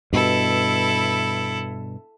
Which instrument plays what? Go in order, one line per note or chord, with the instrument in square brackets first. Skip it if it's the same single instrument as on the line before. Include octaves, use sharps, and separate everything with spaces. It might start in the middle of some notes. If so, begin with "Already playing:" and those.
[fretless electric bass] G2 B2 [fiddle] E4 A4